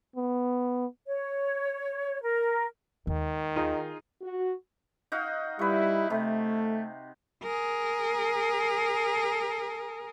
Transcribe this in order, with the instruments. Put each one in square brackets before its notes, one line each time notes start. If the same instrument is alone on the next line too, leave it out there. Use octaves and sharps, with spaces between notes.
[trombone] B3
[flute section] C#5
A#4
[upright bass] D#2 G#3 [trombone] D#3
[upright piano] D#4 F4 G#4
[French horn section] F#4
[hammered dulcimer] D#4 F#4 F5
[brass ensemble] G3 E4 [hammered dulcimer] B4 C#6
[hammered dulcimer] C3 [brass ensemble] A3
[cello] G#4 A#4